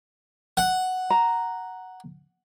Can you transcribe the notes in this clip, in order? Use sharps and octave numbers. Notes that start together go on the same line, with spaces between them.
F#5
A#5